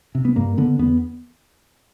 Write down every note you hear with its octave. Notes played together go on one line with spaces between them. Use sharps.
C3
B3
G2 A#3
D3 B3
E2 B3